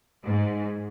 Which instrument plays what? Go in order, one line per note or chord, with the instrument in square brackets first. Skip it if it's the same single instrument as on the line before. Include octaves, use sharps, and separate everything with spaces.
[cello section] G#2